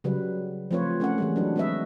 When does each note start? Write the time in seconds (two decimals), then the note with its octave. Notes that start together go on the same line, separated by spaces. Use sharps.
0.04 C#3 F#3 G3 B4
0.71 F3 A3 C4 F4 B4 C#5
1.00 A3 C#4 A#4 F#5
1.18 E3 G3 G#3
1.36 F#3 D4 B4
1.56 G#3 C4 F#4 B4 D#5 E5